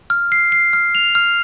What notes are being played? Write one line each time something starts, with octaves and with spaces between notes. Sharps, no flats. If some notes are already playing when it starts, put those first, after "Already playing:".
F6
C7
C7
F6
F7
F6